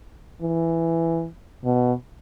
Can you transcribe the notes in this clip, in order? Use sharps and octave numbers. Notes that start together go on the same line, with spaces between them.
E3
B2